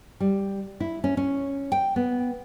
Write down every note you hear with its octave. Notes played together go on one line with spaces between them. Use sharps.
G3
E4
C#4
C#4
G5
B3